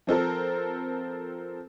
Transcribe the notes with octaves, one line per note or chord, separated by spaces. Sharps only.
F3 C4 A4 A#4